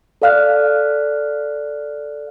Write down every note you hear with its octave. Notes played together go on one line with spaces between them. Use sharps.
A4 D5 F5 F6 F#6